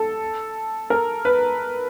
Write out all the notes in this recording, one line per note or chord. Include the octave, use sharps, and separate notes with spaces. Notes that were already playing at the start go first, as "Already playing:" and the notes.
Already playing: A4
A#4
B4